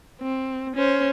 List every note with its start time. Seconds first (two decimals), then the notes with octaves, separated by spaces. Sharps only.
0.22 C4
0.76 C#4 C5